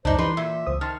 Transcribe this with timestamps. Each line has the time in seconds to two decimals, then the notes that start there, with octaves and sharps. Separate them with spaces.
0.05 C#2 F#2 D4 D#4 C5
0.18 E3 G3 D#4 B4 C6
0.37 A#2 E5
0.66 C#2 C5 D#6
0.81 D#3 A5 C6 F6